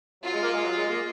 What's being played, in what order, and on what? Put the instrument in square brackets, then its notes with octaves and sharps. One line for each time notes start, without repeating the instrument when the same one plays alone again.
[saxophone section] F#3 [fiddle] F4
[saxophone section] G#3
A#3
G#3
F#3
G#3
A#3